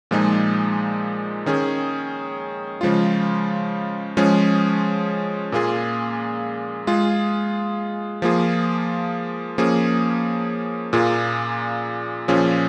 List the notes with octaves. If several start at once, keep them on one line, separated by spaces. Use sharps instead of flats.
A#2 F3 G#3 D#4 G#4
D#3 C#4 G#4
C#3 F3 G#3 F4
F3 G#3 C#4 G#4
A#2 A#3 F4 G#4
G#3 F4 G#4
F3 A#3 F4 G#4
F3 A#3 C#4 G#4
A#2 A#3 F4 G#4
A#2 F3 C#4 F4 G#4